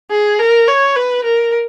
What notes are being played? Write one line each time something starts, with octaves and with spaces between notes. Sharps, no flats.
G#4
A#4
C#5
B4
A#4